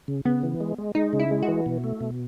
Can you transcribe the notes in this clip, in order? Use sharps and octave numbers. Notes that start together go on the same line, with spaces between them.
C#3
C#3 B3
E3
G#3
G#3
G#3 D#4
C#3
E4
G#3
F#4
E3
B2
A3
B2